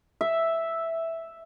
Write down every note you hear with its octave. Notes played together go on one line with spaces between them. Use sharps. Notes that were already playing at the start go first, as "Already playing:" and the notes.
E5